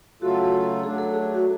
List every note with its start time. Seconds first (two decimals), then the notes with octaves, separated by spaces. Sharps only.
0.22 C#3 F#3 A3 F4 F#4 A4
0.83 F#3 A3 D4 G#4
0.98 A4
1.14 G#4
1.34 F#4